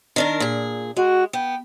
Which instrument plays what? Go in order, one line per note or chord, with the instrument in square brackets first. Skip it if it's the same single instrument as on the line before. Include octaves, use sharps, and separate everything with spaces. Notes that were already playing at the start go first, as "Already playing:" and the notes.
[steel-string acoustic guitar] D#3 D4 A#4
A#2 G#4
[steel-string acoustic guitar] G#3 [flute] F#4
[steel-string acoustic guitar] B3 [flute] G5